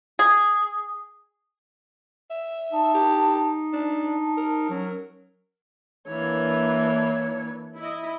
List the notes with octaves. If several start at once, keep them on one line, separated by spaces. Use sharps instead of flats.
G#4
E5
D#4 A5
G4
D4 A5
A#4
F#3 C#4
E3 A#3 D4 C#5
E4 D#5